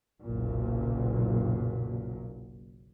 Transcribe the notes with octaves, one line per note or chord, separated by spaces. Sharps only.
F#1 B1 A#2 F#3